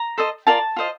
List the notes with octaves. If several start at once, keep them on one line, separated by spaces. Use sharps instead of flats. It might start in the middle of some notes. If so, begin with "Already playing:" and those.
Already playing: A#5
A4 C5 D#5
F4 A#4 D5 A5
F4 C5 D#5